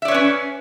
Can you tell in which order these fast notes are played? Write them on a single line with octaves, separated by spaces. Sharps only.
E5 D5 C#5 B4 C#4